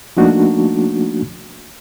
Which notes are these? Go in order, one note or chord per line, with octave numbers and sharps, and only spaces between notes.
F3 A3 A#3 D4 D#4 F#4